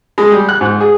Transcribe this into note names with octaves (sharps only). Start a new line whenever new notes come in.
G#3
G3
F#6
G#2
G#4